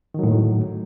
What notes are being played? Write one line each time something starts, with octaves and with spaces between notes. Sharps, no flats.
A2 D#3 F#3